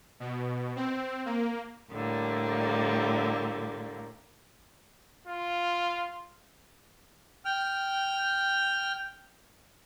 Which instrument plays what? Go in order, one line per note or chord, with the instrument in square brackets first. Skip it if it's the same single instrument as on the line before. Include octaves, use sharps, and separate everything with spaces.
[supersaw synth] B2
C4
A#3
[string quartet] A2 D3 G3 A#3
[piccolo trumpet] F4
[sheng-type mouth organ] G5 F6